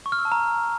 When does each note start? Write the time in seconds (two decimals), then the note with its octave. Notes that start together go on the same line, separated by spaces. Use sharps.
0.06 C#6
0.12 F6
0.19 E6
0.25 A5
0.32 A#5